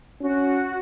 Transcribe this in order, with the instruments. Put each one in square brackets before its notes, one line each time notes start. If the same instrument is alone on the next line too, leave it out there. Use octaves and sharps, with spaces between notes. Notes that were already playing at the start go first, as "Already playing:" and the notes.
[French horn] C#4 [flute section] F#4